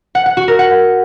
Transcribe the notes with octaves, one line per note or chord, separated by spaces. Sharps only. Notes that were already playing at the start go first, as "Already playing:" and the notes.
F#5
F#5
F#4
A#4
F#5